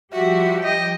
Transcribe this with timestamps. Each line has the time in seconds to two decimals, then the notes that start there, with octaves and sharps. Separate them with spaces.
0.13 F3 G3 F#4 G4 E5
0.63 D#5 G5